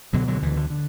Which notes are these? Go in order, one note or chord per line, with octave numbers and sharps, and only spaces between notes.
C#2 B2 D3 F#3
D3 F#3
D2 D3 E3
D3
D3